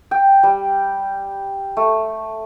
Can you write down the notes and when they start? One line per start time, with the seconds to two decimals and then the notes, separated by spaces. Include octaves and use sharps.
0.11 G5
0.43 G3
1.77 A3